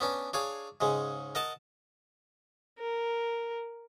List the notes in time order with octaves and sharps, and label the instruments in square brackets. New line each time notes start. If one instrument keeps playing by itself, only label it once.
[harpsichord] B3 C#4 D4
D4 G#4 C#5 F5
G#2 C#3 G#3
A#4 D#5 F#5 A5
[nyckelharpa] A#4